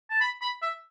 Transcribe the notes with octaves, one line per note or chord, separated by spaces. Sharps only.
A5
B5
B5
E5